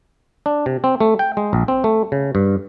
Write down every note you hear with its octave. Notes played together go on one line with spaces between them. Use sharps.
D4
C3
C4
A3
G5
G#3
A#1
C4
A3
C#3
G2